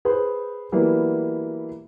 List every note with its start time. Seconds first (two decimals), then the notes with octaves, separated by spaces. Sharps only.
0.05 G#4 B4 C5
0.72 E3 F#3 G3 A#3 B3